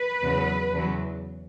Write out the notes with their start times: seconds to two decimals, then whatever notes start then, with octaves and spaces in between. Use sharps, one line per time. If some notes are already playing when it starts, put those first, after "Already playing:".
Already playing: B4
0.22 E2 C#3 F#3
0.73 E2 C#3 F#3